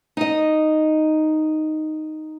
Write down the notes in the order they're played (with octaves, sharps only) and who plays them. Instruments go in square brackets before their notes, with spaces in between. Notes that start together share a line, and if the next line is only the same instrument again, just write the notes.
[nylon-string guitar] D#4 D#5